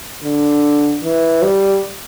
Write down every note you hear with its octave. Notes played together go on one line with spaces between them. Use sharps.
D3
E3
G3